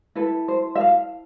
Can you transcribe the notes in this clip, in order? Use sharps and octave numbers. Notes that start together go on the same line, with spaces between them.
E4 A4 B4
C5
E5
F5